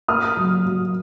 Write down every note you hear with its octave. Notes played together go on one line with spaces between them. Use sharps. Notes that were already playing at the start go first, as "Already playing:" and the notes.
A#3 D#6 F6
F#3
F#3